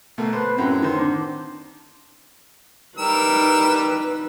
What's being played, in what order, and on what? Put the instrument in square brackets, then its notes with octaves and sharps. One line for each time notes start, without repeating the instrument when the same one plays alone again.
[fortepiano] B2 A3 A#3
[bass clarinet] B4 [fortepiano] C5
[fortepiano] F#2 A2 F#4 [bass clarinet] C4
[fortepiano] D#3 C5
[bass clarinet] D4
[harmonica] G3 A#4 E6 [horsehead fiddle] D#4 B4